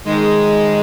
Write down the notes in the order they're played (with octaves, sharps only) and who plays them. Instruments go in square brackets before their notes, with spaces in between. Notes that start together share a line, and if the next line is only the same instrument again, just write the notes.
[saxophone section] G#2 D#3 G#3